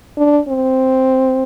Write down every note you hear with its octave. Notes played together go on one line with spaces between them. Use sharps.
D4
C4